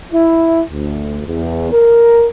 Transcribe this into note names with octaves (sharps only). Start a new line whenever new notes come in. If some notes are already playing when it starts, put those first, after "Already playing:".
E4
D2
E2
A#4